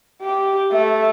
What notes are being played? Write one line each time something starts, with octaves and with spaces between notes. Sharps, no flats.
G4
A3